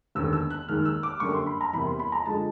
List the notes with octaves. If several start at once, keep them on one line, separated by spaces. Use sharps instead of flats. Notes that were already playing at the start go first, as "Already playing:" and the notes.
E1 D#2 D3 E6
E6
F#6
D#2 D#3 G#3 F6
E6
D6
F#2 D3 G3 A#3 C#6
C6
B5
A#5
E2 C3 E3 G3 A#3 B5
C6
B5
A#5
D3 F3 G#3 A5